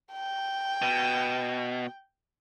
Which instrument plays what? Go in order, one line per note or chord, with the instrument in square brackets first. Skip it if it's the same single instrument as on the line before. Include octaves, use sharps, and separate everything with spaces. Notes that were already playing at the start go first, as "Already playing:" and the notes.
[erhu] G5
[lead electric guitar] B2